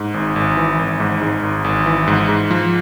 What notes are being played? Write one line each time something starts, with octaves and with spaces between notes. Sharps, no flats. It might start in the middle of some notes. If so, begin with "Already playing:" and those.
Already playing: G#2
G#1
G#1
E3
G#1
G#2
G#2
G#1
G#1
E3
G#2
G#2
F3